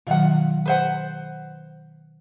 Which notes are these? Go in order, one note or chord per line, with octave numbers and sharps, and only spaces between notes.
B2 D#3 F#3 F4 F#5
B4 C5 F#5